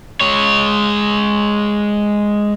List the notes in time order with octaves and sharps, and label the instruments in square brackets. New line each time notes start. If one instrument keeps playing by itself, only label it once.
[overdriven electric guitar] G#3 C#5